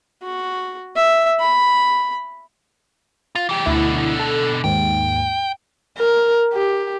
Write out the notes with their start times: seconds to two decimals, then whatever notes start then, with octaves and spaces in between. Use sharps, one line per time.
0.23 F#4
0.96 E5
1.40 B5
3.35 F4
3.49 E3 G4
3.66 D2 B2 D3 E4
4.20 A4
4.64 D#2 G#2 G5
5.98 A#4
6.53 G4